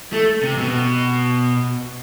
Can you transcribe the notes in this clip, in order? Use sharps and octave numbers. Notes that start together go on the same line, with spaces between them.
A3
C3
B2